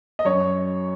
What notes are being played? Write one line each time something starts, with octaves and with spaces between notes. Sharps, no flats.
D#5
F#2 C#5